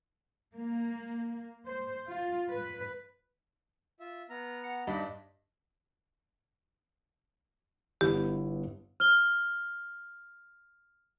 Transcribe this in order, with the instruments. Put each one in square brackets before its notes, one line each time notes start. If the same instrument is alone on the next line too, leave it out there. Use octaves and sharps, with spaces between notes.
[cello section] A#3
C5
F4
B4
[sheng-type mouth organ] F4 E5
B3 A#5 F6
[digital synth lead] F#5
[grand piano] G2 [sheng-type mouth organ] D4 D#4 B5 [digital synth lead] D#5
[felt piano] G1 B3 E4 [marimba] G4
[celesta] F6 G7